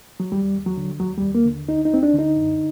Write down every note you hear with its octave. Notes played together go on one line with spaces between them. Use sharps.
F#3
D#2 G3
D#2
F#3
D3
D#2 F#3
D#2 G3
A#3
D3
D2 D#4
D#4
D2 C4
D4
D3 D#4
F#2